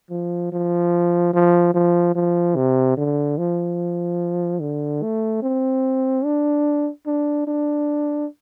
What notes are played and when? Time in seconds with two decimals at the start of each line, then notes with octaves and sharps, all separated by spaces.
0.10 F3
0.52 F3
1.34 F3
1.74 F3
2.15 F3
2.56 C3
2.98 D3
3.38 F3
4.61 D3
5.02 A3
5.43 C4
6.25 D4
7.07 D4
7.47 D4